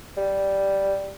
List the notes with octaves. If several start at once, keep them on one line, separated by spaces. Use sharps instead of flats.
G3